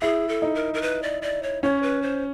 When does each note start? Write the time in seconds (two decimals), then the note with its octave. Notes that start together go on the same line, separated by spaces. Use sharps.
0.02 E4 G#4
0.29 A4
0.42 D#4
0.55 A#4
0.74 A#4
0.82 B4
1.03 D5
1.22 D5
1.43 C#5
1.63 C#4 C#5
1.83 B4
2.02 C5